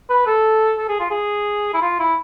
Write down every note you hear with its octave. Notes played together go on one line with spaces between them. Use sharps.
B4
A4
A4
G#4
F4
G#4
E4
F4
E4